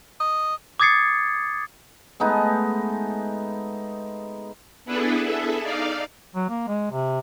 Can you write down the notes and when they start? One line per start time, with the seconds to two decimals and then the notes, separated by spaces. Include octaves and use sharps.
0.20 D#5
0.80 D6 D#6 G#6 A6 C7 C#7
2.20 G#3 A3 B3 D#4
4.85 B3 D4 E4 G#4 A4 B4
5.20 G#4 A4 E5
5.62 D#4 D5 F5
6.35 F#3
6.49 A#3
6.68 G#3
6.91 C3